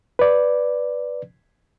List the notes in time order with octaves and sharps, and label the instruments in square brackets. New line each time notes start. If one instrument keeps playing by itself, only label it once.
[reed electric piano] B4 D5